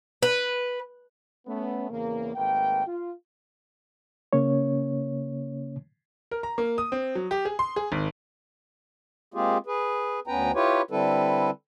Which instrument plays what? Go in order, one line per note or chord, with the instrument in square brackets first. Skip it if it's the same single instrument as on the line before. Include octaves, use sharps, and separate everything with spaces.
[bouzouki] B4
[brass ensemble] A3 B3 C#4
E2 C#3 A#3
G#1 A3 A#3 B4 G5
F4
[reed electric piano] C#3 A#3 C#4 C#5
[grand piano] A#4
A#5
A#3
D#6
C4
F#3
G4
G#4
C6
G#4
G#1
[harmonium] G#3 A#3 C4 F4 G4 G#4
G#4 B4
D2 B3 C#4 B4 G5 A#5
E4 F4 G4 B4 C#5
D3 G3 C4 E4 A4 B4